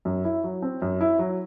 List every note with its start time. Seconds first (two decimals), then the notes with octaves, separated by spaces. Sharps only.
0.05 F#2
0.25 E4
0.44 F#3
0.62 C4
0.82 F#2
1.01 E4
1.19 F#3